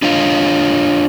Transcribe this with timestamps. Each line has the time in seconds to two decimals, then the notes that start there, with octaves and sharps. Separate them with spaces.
0.02 D4 F4 C#5 D#5 F5